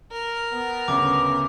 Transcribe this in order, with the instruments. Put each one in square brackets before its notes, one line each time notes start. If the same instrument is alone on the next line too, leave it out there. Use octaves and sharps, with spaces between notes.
[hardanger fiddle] A#4
[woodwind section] B3
[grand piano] D2 C#3 C#4 [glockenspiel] D6